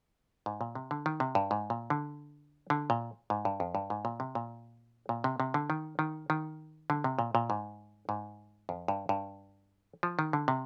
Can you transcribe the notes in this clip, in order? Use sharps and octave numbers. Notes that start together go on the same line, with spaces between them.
G#2
A#2
C3
D3
D#3
C3
G2
G#2
A#2
D3
D3
A#2
G#2
G2
F2
G2
G#2
A#2
C3
A#2
A#2
C3
C3
D3
D#3
D#3
D#3
D3
C3
A#2
A#2
G#2
G#2
F2
G2
G2
F3
D#3
D3
C3